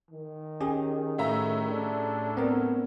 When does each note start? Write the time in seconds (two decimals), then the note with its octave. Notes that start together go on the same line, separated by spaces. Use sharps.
0.11 D#3
0.61 C#4 G4 G#4
1.18 A2 E5 A#5
1.70 D4
2.37 B3 C4 A#4